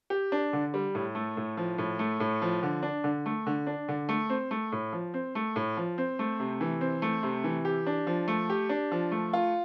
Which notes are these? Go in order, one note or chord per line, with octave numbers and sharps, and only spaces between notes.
G4
D4
D3
G3
A2
A3
A2
F3
A2
A3
A2
F3
D3
D4
D3
A3
D3
D4
D3
A3
C4
A3
A2
F3
C4
A3
A2
F3
C4
A3
C3
E3
C4
A3
C3
E3
G4
D4
F3
A3
G4
D4
F3
A3
F4